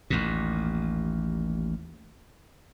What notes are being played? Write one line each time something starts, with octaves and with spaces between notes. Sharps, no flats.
A1 D#2 A#2